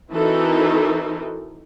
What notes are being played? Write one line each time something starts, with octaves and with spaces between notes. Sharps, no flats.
E3 C4 D#4 F#4 A4 A#4